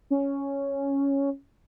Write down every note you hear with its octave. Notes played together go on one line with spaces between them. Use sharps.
C#4